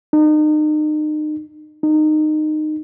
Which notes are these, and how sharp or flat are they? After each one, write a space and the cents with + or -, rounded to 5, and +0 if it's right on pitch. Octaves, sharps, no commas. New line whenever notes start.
D#4 -35
D#4 -20